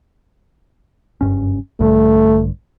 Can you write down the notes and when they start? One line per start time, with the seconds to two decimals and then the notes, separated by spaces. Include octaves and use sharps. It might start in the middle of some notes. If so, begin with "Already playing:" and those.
1.21 F#1 G2 C#4
1.80 A#1 G2 D3 A3